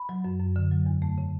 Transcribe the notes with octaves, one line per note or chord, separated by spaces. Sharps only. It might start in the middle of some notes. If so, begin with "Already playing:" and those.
Already playing: B5
F#3
F#2
F#2
D3
F#3
E2
A3
C#3